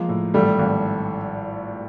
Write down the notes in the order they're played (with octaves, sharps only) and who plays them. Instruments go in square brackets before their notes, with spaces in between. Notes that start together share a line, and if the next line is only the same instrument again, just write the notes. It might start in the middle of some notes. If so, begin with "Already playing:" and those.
Already playing: [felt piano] F3 [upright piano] G#3 A#3
[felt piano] A2
[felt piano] G#1 [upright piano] G3 A3
[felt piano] G#1